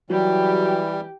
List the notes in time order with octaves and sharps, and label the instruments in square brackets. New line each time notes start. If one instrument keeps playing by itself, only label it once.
[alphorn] E3 [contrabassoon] F#3 [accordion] G3 [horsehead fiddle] G4